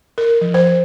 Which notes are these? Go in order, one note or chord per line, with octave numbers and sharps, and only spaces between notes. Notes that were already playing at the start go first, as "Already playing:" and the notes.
A#4
F3
C5